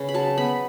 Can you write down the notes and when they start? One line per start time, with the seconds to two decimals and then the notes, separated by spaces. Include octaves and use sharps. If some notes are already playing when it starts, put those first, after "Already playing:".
Already playing: C#3 B4
0.09 B5
0.14 F#3 A5
0.38 B3 B5